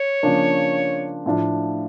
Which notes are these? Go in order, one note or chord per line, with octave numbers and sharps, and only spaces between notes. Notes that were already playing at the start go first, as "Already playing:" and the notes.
Already playing: C#5
C#3 F3 A#3 D4
A2 F3 A3 D4 F4